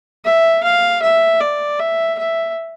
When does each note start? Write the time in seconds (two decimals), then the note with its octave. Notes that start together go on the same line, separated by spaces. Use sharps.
0.25 E5
0.63 F5
1.02 E5
1.41 D5
1.79 E5
2.19 E5